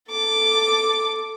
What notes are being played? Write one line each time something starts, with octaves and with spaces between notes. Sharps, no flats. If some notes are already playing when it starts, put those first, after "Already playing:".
A4 D6